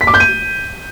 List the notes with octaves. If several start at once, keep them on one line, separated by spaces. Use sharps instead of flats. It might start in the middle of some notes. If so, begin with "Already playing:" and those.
B6
D6
G6
D#7